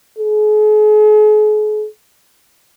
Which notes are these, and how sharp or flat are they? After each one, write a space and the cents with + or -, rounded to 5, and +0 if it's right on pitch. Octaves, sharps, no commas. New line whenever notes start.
G#4 +40